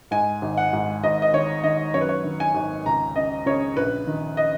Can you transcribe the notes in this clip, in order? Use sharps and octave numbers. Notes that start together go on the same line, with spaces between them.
G#2 G#5
G#1
F#5
G#2
G#1 D#5
D#5
D#3 C#5
D#3 D#5
F#2 C#5
B4
C#5
D#3
G#5
G#1
C#2 A#5
C#3 D#5
C#3 C#5
A#1 B4
D#3
D#5